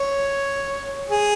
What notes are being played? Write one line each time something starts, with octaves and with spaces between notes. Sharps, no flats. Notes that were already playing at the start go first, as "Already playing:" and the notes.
Already playing: C#5
G#4